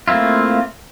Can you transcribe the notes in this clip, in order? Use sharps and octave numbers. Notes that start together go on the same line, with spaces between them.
A3 A#3 C4 E4 F4